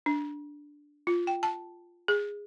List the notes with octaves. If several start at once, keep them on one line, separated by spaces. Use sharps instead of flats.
D4
F4
G5
A5
G#4